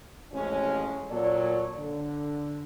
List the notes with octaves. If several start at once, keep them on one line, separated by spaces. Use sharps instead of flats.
A1 F2 G#3 C#4
A#2 F#3 A4 C#5 D5
D3